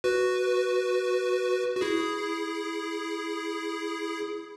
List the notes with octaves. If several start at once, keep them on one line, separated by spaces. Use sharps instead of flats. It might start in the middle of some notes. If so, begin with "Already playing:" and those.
F#4 B4
F#4
E4 G#4